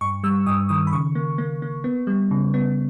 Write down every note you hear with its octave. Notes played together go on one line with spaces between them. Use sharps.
G2 C#6
G3 E6
G2 D#6
D#3 D#6
B5
C#3 C#6
A#3
A#3
A#3
B3
G3
C#3
B3